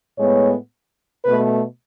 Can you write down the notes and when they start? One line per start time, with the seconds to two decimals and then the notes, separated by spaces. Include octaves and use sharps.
0.18 A2 G#3 B3 C#5
1.25 B2 A3 B4